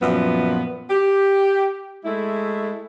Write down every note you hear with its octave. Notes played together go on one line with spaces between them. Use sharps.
F#2 A#2 F3 B3
G4
G#3 A3 E4